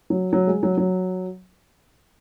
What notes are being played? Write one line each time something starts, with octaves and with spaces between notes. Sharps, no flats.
F#3
F#3
G#3
F#3
F#3